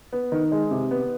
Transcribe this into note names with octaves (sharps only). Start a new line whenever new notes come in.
B3
D#3
G#3
C3
B3